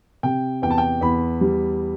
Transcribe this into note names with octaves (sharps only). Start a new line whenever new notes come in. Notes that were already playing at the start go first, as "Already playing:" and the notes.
C3 G5
E2 G5
A5
G5
E2 B5
G3